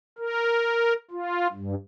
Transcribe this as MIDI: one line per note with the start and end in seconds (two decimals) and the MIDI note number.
0.18 0.93 70
1.11 1.47 65
1.52 1.75 43